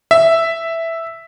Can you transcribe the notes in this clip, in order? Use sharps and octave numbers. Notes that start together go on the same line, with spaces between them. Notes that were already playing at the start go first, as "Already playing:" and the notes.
E5